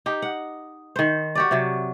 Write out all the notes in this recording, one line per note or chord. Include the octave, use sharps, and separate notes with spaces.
D#4 G4
F#5
D#3 C5
F#4 G4 D5
C3 F#3